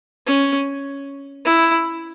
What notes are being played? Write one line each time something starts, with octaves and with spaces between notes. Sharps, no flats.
C#4
E4